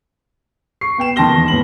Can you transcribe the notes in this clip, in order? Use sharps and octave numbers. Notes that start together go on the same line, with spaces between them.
C#6 C7
B3 G5 E7
D#3 A5 C6 A#6 G7
E2
A2 B3 B5 F#7